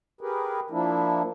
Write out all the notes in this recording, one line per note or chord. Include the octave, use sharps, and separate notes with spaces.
G4 G#4 A#4 B4
F3 A#3 D4 E4